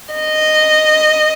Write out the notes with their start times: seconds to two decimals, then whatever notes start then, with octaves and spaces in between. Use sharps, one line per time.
0.15 D#5